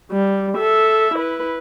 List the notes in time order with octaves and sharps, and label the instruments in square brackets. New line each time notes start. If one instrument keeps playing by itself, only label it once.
[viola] G3
A4 E5
E4 B4